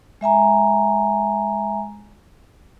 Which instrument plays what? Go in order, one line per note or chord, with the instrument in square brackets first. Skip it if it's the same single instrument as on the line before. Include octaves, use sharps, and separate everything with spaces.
[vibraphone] G#3 E5 G#5 A#5